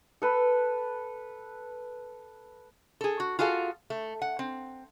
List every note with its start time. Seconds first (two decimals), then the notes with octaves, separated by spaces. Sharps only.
0.22 A4 B4
3.01 G#4 A4
3.20 F#4
3.39 F4 F#4 G#4 A4 F5
3.90 A3
4.22 F#5
4.39 C4